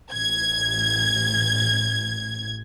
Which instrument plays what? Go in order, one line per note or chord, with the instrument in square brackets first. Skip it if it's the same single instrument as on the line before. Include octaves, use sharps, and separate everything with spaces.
[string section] A1 G#6